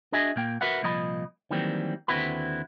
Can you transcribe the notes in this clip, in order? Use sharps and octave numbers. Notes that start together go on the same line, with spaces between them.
D4 F#4 G#4 D#5 E5 G#5
A#2 A#3 G5
F#4 A#4 B4 E5 F#5
C2 A#2 F3 D#5 A#5 B5
D#3 E3 F#3 G3 A#3 C4
D#2 D3 C4 E4 F#4 B4